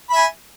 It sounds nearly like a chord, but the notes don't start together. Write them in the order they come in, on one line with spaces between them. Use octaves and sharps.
B5 E5 G#5